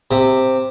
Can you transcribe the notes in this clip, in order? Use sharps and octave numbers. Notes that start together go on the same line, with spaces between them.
C3